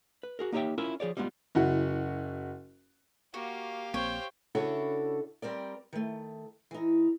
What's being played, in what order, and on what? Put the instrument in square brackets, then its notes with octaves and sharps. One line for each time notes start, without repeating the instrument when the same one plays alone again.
[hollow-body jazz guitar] B4
F#4 G#4 A#4
A#3 D#4 G4 C#5 E5 G5
C#4 E4 F4 A#4 E5
F3 G#4 C#5 D5
G3 G#3 B3 D#4 F4
[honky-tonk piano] F#1 E4 F#4 F#5
[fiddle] A#3 [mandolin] F#4 [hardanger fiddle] G4 F5
[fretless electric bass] A#1 A#3 C4 [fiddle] C5 G5 [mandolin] C#5
[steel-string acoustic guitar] C#3 D4 E4 F#4 A4 C#5
G3 C4 A#4 D5
D#3 A3
E3 D#4